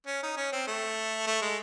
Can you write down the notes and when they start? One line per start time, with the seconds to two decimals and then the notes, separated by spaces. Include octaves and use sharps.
0.07 C#4
0.23 D#4
0.37 C#4
0.52 C4
0.67 A3
1.27 A3
1.42 G#3